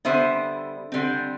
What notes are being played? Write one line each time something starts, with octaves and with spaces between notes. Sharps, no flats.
D3 G3 B3 C5 E5
D3 G3 C4